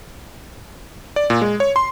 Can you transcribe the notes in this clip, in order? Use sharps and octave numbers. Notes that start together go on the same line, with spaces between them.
D5
A#2
G#3
C#5
C6